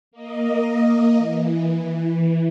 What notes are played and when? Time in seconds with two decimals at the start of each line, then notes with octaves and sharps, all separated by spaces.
0.11 A#3 D#5
1.18 E3